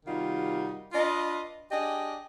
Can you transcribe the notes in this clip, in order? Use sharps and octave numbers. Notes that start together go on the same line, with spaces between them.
C3 D#3 G3 D#4 F4 F#4
D4 F4 B4 D#5
D4 G4 G#4 D#5